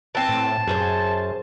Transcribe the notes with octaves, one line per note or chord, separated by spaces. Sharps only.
E3 C4 A5
A2
F#2 G#4 A4 C5